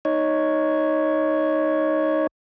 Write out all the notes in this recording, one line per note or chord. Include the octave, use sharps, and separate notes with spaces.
D#4 C#5